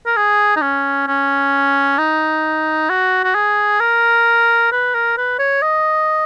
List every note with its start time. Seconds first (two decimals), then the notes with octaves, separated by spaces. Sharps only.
0.06 A#4
0.17 G#4
0.56 D#4
0.62 C#4
1.07 C#4
1.98 D#4
2.90 F#4
3.24 F#4
3.35 G#4
3.80 A#4
4.72 B4
4.94 A#4
5.18 B4
5.39 C#5
5.62 D#5